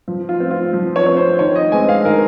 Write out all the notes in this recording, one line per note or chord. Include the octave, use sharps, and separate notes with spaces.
F3
F4
C4
F4
F3
C#5
C4 C#5
C5
D#3 C#5
D#5
G#3 C4 G#5
F5
D#3 A#4